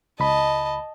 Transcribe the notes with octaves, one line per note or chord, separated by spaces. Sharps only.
C#2 D#5 A5 B5